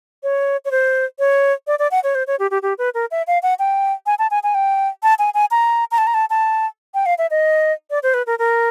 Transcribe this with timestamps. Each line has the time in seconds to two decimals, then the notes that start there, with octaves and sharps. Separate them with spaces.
0.23 C#5
0.65 C#5
0.71 C5
1.19 C#5
1.67 D5
1.79 D5
1.91 F#5
2.04 C#5
2.15 C5
2.27 C#5
2.39 G4
2.51 G4
2.62 G4
2.78 B4
2.94 A#4
3.11 E5
3.27 F5
3.43 F#5
3.59 G5
4.06 G#5
4.19 A5
4.31 G#5
4.43 G#5
4.54 G5
5.03 A5
5.19 G#5
5.34 G#5
5.51 A#5
5.91 A#5
5.98 A5
6.07 A#5
6.14 A5
6.30 A5
6.94 G5
7.06 F5
7.18 E5
7.31 D#5
7.90 D5
8.03 C5
8.14 B4
8.27 A#4
8.39 A#4